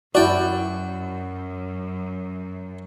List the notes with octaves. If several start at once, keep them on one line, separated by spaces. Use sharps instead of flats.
F#2 E4 F#4 D5 G5